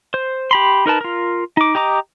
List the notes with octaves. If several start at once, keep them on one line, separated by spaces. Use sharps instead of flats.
C5
G4 B5 C6
D#4 A#4 B4 A5
F4 A#4
D#4 D6
G4 D#5 A#5 D6